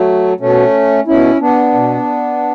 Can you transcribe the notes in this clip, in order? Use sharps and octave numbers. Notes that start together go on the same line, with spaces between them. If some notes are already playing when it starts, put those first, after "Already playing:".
Already playing: F#3 A3
B2 A3 C#4
B2 C#4 E4
B3 D4
B2